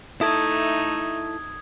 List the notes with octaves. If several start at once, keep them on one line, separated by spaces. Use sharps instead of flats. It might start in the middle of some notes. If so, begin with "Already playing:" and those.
A3 D#4 E4 A4 D#6 G#6